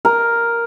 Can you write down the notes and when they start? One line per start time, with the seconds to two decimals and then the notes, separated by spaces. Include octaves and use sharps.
0.05 A#4